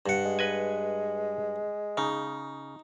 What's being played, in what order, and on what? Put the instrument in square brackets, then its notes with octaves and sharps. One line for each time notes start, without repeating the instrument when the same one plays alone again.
[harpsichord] G2 F#5
[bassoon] G#3
[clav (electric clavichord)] B4 D#5 G#5
[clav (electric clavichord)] C#3 [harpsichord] D#4